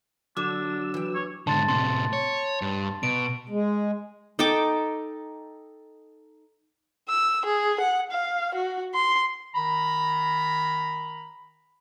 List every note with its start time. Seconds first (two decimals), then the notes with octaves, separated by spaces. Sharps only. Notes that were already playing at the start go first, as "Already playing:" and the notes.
0.37 D3 F#3 D4 D6 E6
0.94 E3 G5
1.15 C#5
1.47 G#2 D3 A5 C6 A6
1.68 A2 C3 C6
2.13 C#5
2.62 G2
3.03 B2 D7
3.49 G#3
4.39 D#4 A4 G5 D6
7.09 E6
7.46 G#4
7.80 F#5
8.11 F5
8.54 F#4
8.95 C6
9.54 D#3 A#5 B5